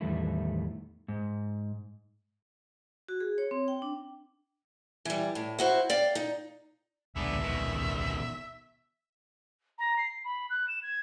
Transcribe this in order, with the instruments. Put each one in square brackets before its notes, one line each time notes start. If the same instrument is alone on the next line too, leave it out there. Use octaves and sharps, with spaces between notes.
[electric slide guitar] E2 A2 D#3 G3 A3 E4
[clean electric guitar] G#2
[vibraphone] F#4
G#4
C#5
C4
G5
D4
[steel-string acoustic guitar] E3 G3
A2
E4 F#4 C5
D5 F5 G5
D#4
[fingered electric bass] D1 A#1 G#3 [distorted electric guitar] D3 B3 [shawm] E5
[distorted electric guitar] B2 D#3
[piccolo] A#5
C7
B5
F#6
E7
G#6